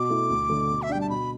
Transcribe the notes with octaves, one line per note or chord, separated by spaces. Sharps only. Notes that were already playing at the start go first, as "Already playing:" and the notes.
Already playing: B2 D6
A3 E4
D2
D3 A3
B2
E5
G3 D4 G5
A5
B2 B5